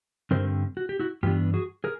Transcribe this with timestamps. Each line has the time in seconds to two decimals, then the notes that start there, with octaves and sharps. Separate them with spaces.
0.31 G2 D3 G3 C4 A#4 C5
0.77 F#4
0.89 G4
0.99 E4 F#4
1.23 G2 E3 B3 D4 F4 G4
1.54 F#4 G#4
1.84 G#4 A#4